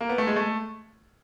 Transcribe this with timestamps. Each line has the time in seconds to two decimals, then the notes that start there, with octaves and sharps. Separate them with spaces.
0.01 A#3
0.09 B3
0.18 A3
0.27 G#3
0.36 A3